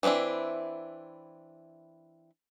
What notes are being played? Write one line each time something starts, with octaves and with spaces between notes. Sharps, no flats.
E3 B3 C4 D4 E4